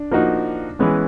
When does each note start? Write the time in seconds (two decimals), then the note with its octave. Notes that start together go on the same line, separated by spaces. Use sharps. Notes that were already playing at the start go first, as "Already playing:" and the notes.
Already playing: D4
0.11 F3 A#3 D#4 F#4
0.79 E3 G#3 B3 C#4